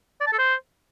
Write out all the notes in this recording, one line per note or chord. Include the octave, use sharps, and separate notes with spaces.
D5
A5
A4
C5